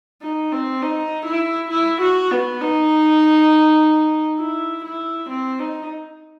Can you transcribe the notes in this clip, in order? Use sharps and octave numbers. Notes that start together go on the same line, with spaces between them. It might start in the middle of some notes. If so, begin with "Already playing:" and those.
D#4
C4
D#4
E4
E4
F#4
B3
D#4
E4
E4
C4
D#4